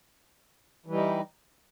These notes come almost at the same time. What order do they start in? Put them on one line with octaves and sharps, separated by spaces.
E3 G3 D#4